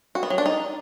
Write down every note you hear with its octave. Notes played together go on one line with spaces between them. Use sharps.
F#4
B3
F#3
D4
D#4